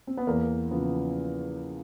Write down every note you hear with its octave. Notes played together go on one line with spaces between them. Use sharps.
C4
B3
E2 A#3
C#3 F3 B3